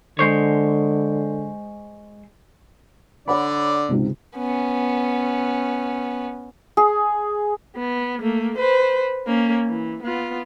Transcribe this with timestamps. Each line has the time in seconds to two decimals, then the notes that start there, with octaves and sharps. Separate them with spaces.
0.19 D3 G#3 C5 C#5
3.28 D3 C#5 D5 F#5 B5
3.89 C#2 G#2 C3
4.36 B3 C#4
6.77 G#4
7.76 B3
8.20 A3 A#3
8.58 B4 C5
9.27 A#3 C#4
9.66 E3
10.03 B3 F4